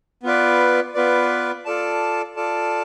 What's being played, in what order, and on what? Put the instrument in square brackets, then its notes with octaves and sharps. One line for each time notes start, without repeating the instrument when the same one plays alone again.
[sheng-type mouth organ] B3 F4 B4 D5
B3 F4 B4 D5
F4 A4 D5 A5
F4 A4 D5 A5